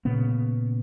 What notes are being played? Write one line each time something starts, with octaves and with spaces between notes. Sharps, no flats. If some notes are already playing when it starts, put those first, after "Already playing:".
A#2 C#3 B3